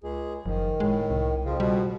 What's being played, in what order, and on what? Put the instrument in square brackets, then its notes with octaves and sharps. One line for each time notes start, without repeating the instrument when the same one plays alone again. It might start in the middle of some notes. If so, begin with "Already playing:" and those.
[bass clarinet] C#2 [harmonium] G#4
[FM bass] F#1 [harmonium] D#3 [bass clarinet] F3
[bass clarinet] A2 [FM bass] G#3
[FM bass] C2
[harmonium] F2 F3 [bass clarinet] C#3
[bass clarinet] B2 [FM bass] G3